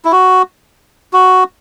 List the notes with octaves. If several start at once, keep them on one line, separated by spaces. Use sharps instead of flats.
E4
F#4
F#4